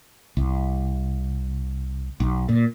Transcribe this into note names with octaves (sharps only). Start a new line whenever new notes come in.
C2
B1
A#2